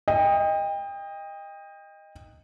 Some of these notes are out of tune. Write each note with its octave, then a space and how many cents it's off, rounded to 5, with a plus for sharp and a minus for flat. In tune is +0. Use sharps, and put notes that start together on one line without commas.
D#5 +0 G5 +30